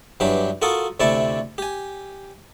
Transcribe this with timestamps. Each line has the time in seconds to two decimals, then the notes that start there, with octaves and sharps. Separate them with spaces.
0.20 G2 E3 F#3 D4 G4
0.62 F4 F#4 A4 A#4 C#6 D#6
1.00 D2 C3 E4 D5 A5 C#6
1.58 G4 G#5